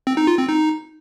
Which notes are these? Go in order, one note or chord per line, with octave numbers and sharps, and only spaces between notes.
C4
D#4
F4
C4
D#4